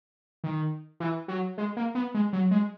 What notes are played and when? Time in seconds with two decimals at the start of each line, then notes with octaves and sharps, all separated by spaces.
0.44 D#3
1.00 E3
1.28 F#3
1.58 G#3
1.77 A#3
1.95 B3
2.14 G#3
2.33 F#3
2.51 G#3